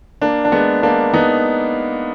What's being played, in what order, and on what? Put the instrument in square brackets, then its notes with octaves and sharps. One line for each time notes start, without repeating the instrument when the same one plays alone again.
[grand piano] A#3 D4
D4
G#3 B3
A#3 D4
B3 D#4